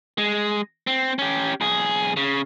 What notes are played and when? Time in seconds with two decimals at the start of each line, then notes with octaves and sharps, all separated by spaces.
0.18 G#3
0.87 C4
1.19 C#4 G4
1.61 B1 G#4
2.17 C#3